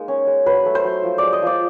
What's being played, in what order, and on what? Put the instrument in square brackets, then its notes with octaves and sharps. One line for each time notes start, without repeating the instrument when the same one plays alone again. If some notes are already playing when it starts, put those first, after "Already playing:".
Already playing: [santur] G#3 A#3 D#4
C#4
G#3
F#3 B4
A3
C5
F#3
F3
G#3 D5
D#5
F3 D5